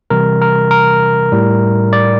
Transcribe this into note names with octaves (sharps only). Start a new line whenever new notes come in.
C3 E3 G3 A#4
A#4
A#4
A2 G3
D5